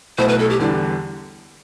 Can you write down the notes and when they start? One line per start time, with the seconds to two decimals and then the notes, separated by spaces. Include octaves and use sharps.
0.18 B1 B2 A3 E4 C5
0.28 B4
0.39 A4
0.50 G4
0.59 E2 D3 G3 D4 E4